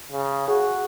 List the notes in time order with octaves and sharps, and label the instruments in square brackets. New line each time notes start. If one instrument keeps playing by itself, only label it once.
[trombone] C#3
[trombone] F#4 [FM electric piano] G#4